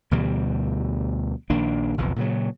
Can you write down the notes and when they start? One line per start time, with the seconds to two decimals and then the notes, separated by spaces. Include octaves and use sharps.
0.11 D2 B2 E3 G3
1.50 A#1 D#3 A#3 D4
1.98 F#1 B1 F2 E3
2.16 A#2 C#3 F#3